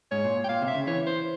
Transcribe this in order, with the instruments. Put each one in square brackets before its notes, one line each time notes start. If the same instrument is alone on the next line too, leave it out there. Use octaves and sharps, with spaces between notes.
[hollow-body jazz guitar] G#2 [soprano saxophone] C#5
[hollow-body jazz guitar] A#2
[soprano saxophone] G5
[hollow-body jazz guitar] A#2 [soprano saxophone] F5
[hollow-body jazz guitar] C3
[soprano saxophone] E5
[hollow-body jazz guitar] C#3
[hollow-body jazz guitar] E3 [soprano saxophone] C#5
[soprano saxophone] C5